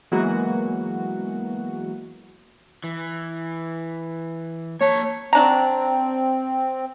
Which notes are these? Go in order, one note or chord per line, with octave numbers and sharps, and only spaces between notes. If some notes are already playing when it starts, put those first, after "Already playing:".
E3 F#3 G#3 A#3 B3 F#4
E3
A#3 C#5 A5
F#3 C4 D4 A#5